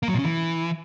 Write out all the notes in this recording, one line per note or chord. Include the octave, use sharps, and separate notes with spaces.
A#3
F#3
A#2
C#3
E3